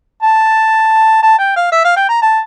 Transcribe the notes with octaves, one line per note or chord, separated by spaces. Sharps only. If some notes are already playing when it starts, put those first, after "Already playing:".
A5
A5
G5
F5
E5
F5
G5
A#5
A5